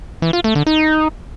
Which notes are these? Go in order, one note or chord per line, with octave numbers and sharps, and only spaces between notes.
E3
F4
A3
D3
D#4